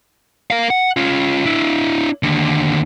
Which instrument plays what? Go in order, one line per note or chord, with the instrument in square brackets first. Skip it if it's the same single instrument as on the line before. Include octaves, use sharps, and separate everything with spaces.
[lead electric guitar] A#4 F5
F#5
C#4 F4
D4 E4
D#2 D3